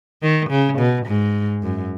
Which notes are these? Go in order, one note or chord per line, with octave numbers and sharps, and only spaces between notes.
D#3
C#3
B2
G#2
F#2